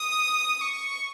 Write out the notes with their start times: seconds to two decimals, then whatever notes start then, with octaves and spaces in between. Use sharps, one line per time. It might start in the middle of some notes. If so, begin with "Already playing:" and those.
Already playing: D#6
0.61 C#6